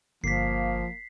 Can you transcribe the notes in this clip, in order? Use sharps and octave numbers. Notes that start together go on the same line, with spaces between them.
G1 F3 A#3 B6 C7